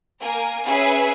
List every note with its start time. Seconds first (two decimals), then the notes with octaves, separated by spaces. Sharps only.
0.20 A#3 A#4 G#5
0.64 C#4 G#4 B4 E5